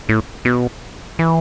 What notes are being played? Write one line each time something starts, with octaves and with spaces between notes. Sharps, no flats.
A2
B2
E3